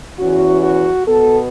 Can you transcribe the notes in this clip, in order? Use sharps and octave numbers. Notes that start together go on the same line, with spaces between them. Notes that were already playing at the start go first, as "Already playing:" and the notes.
E2 E3 C#4 F#4
F#4
B2 B3 A4